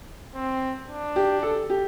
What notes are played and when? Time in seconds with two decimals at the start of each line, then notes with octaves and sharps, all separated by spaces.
0.35 C4
0.88 D4
1.16 G4
1.43 A4
1.70 G4